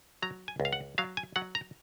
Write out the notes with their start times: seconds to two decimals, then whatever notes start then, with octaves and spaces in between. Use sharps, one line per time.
0.22 F#3 A#5
0.48 G#5
0.60 C#2
0.65 F5
0.73 F#5
0.98 F#3 F5
1.17 G#5
1.36 F#3 F#5
1.55 A#5